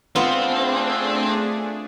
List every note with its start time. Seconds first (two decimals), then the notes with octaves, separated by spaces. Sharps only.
0.16 A3 B3 C4 D4 F4 G#4